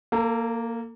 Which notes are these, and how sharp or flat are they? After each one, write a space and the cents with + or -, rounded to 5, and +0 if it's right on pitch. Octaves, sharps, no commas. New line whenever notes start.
A#3 -5 A4 +35